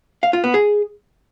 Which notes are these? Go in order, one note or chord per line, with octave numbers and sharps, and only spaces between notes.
F5
F4
B3
G#4